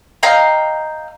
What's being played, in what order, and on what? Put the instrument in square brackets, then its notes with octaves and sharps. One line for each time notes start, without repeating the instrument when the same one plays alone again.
[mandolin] D#5 F5 G5 A#5